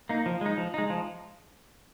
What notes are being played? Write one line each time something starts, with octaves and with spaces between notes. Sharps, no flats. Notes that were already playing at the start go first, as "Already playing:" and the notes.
A#3 D#4
F3
G#3 D#4
F3
G#3 D#4
F3